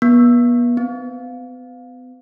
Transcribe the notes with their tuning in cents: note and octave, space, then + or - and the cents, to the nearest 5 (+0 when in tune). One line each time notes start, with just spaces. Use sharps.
B3 -40
B3 +40